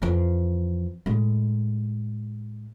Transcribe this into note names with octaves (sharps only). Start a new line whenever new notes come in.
F2 E3
A2 G#3